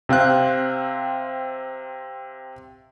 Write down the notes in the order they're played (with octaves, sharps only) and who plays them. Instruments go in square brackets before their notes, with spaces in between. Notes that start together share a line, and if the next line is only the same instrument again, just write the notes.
[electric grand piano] C3 C4 F5 F#6